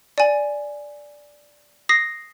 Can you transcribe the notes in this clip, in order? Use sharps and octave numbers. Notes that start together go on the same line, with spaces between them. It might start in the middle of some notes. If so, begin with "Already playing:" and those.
D5 G#5
D#6 A#6 C7